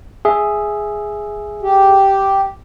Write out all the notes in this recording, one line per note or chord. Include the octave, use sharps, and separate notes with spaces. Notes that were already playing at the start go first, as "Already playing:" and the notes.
G#4 E5
G4